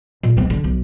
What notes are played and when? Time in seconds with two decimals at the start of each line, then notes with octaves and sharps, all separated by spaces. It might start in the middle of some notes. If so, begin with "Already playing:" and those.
0.23 A#2
0.37 G#3 C4
0.50 D3
0.64 B1